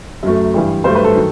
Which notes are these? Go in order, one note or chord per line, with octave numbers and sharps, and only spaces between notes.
F#2 F#3 A3
G2 E3 G3
G2 F#3 A3 C5
B4
A4
D#3 F#3